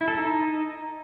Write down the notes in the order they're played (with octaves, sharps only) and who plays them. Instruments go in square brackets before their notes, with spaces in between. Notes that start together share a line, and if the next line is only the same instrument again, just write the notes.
[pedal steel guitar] E4
A4
D#4